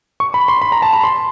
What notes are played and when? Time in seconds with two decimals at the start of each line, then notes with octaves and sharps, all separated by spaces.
0.20 C#6
0.34 B5
0.48 C6
0.62 B5
0.72 A#5
0.82 A5
0.93 B5
1.04 C6